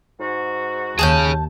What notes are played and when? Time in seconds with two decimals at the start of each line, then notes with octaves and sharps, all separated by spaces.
0.19 G#2 F#4
0.99 D#2 G#4 C#5 A5 F#6 G6